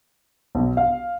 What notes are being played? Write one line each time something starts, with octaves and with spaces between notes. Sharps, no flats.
B1
F5